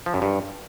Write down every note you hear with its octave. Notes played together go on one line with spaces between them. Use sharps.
F3
F#2
G2